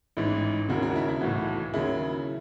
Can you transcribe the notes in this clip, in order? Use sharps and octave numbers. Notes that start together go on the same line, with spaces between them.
A1 G#2 E3 E4
E1 D#2 C#3 F#4
F#4
E4
E4
B1 A2 E3 F#4
D#2 C#3 F#3 E4 G#4